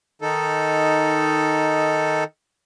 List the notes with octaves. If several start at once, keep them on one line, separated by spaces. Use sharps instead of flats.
D#3 D#4 A4